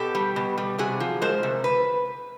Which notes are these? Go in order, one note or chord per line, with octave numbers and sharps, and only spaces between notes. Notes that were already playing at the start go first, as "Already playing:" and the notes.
Already playing: B2 G4 A4
G3
B2
G3
C3 F#4 G#4
F3
G#3 A#4 C5
C3
B4